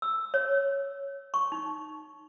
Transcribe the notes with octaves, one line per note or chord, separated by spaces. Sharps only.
E6
C#5
C#6
D#4